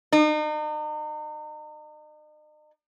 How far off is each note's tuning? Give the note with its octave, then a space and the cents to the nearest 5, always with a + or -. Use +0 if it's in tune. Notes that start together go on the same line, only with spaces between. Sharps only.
D#4 -40